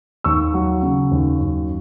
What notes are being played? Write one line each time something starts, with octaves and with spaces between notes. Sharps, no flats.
D#2 C#6 E6
F#3
C#3
D#2
F#2